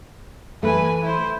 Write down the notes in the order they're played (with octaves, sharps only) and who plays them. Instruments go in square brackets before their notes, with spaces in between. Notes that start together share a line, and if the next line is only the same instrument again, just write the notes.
[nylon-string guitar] E3 A3 [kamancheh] B4 G#5
[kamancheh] E4 C5